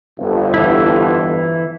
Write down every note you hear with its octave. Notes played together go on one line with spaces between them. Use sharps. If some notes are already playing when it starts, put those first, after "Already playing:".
G1 F2
E3 E4